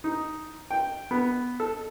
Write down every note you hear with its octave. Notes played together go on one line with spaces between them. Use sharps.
D#4
G5
B3
A4